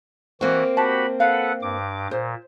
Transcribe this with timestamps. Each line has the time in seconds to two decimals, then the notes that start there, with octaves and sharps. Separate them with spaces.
0.41 E3 A#3 C4 F#4
0.77 F#4 G4 A5 B5
1.20 A4 B4 F5 F#5
1.62 G2 D6
2.11 A#2 C5